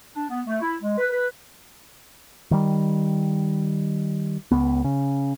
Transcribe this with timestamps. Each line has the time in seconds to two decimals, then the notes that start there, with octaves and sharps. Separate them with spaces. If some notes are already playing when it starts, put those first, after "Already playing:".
0.14 D4
0.30 B3
0.47 A3
0.61 E4
0.82 G#3
0.98 B4
1.11 B4
2.51 D#3 G3
4.51 C#2 B3
4.84 C#3